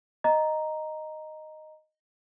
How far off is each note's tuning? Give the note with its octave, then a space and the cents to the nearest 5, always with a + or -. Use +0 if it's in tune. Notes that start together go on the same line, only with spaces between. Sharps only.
D#5 -5 A#5 +0